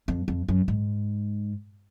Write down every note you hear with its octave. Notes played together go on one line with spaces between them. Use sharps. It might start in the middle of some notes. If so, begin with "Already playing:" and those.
F2
F2
F#2
G#2